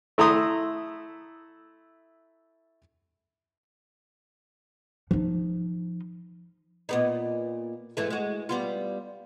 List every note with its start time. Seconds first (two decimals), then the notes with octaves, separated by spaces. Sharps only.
0.18 A3 E4 A#5 C6 D#6
5.11 F3 D#4
6.89 A#2 B3 D#4
7.97 G#2 E3 A3
8.10 G#3 F#4
8.49 G3 B3 F4